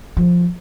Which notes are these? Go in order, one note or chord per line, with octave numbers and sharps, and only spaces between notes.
F3